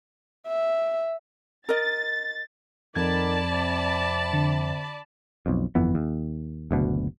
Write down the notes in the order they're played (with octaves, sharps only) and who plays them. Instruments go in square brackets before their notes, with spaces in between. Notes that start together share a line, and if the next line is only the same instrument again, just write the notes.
[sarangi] E5
[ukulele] A#4 D#5 [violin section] A6
[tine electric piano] F2 G#6 [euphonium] D#3 [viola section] D5 A5 B5
[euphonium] C3
[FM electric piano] D3
[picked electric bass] B1 F2
G1 F2 E3 B3
D#2
F#1 D2 B2